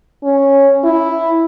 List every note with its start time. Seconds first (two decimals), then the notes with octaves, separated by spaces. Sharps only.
0.24 C#4
0.84 E4